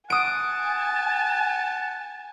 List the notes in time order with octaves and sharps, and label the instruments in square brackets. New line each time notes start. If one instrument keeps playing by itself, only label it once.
[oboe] F#5 [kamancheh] G#5 A5 [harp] D#6 D7